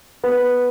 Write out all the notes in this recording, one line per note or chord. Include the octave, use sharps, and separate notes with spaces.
B3 B4